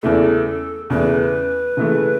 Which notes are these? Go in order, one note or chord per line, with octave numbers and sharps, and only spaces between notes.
E2 C#3 E3 A3 A4
E2 C#3 E3 A3 B4
C#3 E3 A3